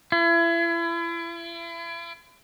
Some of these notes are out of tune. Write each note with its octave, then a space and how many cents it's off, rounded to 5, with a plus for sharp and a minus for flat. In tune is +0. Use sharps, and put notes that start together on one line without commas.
E4 +35